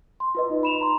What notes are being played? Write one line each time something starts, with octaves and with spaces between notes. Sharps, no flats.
C6
F4 B4 D#5
D#4
B5 E7 F7
A#5 C6